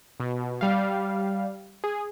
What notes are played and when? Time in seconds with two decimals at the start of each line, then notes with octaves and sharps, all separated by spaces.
0.20 B2
0.61 G3 F5
1.84 G#4